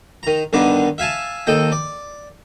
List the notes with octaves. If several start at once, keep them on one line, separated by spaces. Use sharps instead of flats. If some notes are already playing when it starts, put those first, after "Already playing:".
D#3 A#5
G2 D3 D#3 B3 D6
E5 F5 G#5 A5
D#2 A4 D#5 G5
D5